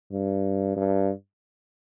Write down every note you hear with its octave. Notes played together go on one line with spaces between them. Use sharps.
G2
G2